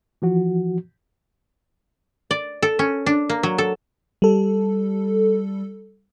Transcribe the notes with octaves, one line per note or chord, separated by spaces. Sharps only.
E3 F3 F#4
D5
A4
C#4
D4
A#3
F#3
A4
G3 A4